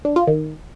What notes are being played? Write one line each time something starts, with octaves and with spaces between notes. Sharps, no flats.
D4
F4
D#3